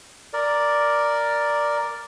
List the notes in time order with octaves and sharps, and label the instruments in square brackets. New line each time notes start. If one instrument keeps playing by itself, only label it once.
[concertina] A#4 D5